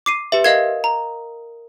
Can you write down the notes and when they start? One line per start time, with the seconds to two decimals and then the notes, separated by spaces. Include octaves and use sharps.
0.06 D6 C7 D#7
0.32 G4 B4 E5
0.44 A#4 D#5 F5 G#6
0.84 A#5